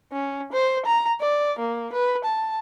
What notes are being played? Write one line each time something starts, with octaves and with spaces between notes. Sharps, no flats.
C#4
C5
A#5
D5
A#3
B4
A5